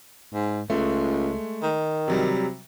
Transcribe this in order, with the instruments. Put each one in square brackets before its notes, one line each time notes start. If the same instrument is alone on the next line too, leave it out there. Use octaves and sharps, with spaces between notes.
[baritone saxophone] G#2
[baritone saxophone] C#2 [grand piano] G#3 A3
[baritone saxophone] D#3
[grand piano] C3 F#3 G3